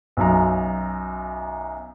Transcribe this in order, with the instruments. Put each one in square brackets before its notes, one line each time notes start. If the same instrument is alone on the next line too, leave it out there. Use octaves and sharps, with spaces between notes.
[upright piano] B1 F#2 A#5